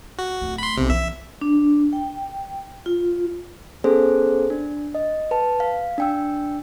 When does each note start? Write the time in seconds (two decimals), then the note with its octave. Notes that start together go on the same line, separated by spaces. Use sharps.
0.19 F#4
0.41 D1 A3
0.58 B5 C6
0.77 B1 C3
0.90 E3 C#4 E5
1.41 D4
1.93 G5
2.86 F4
3.84 B3 C#4 G#4 A4 C5
4.50 D4
4.95 D#5
5.31 B4 A5
5.60 F5
5.98 D4 G5 E6